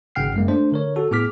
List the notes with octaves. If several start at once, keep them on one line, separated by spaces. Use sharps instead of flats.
G#1 C#3 F#5 G5 F6 C7
F#2 G#3 A#3
A3 D4 C5
D3 A#4 C#5
F#4 A4
A2 B3 G#4 D6 F6 B6